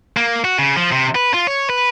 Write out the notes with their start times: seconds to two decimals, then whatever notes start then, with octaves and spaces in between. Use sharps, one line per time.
0.17 A#3
0.45 F#4
0.59 C#3
0.76 F3
0.92 C3
1.15 B4
1.34 F4
1.47 C#5
1.70 B4